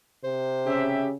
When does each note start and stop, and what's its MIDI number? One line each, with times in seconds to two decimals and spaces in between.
0.24 1.06 48
0.24 0.85 72
0.67 1.14 49
0.67 1.07 67
0.67 1.07 76